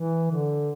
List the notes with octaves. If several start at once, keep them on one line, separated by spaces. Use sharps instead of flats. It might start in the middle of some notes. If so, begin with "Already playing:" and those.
Already playing: E3
D3